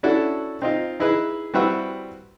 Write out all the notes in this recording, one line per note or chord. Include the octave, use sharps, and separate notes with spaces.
C#4 D4 E4 F#4 A4
C4 D#4 F4
D#4 E4 G#4 B4
G3 C4 E4 F#4 B4 E5